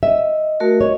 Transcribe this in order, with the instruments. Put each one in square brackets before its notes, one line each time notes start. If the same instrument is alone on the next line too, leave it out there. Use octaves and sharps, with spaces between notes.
[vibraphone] D#5 [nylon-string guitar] E5
[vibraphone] A3 F#4 A#4
[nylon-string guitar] C#5 [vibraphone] D#5